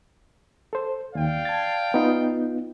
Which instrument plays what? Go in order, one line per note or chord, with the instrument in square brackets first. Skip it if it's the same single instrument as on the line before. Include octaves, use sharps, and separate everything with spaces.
[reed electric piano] A4 C5
[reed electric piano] D#2 [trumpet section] D5 F5 G5
[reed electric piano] A5 G#6 A6
B3 D#4 F4